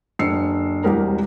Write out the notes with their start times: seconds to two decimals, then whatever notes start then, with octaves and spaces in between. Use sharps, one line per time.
0.19 F#1 D3 E6 C7 C#7
0.84 E1 C2 G4 A#4 A#5